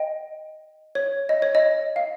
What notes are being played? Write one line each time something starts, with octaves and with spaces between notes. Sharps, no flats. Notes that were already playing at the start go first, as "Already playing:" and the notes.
Already playing: D#5 G5
C#5
D#5
C#5
D#5
F5